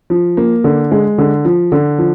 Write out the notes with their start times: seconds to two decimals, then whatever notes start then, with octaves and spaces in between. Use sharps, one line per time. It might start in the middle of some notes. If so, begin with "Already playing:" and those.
0.10 F3
0.37 A#3
0.64 D3
0.91 G#3
1.18 D3
1.45 F3
1.72 D3
1.98 F3